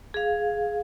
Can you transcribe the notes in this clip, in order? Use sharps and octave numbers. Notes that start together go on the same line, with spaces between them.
G#4 F5